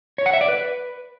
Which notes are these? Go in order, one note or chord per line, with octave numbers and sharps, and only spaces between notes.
C#5
F#5
E5
D5
B4